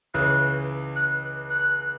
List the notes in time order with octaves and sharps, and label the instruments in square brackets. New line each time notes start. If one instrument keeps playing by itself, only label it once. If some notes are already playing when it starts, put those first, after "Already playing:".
[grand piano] C#2 C#3 E3 [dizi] F#6
[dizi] F#6
F#6
F#6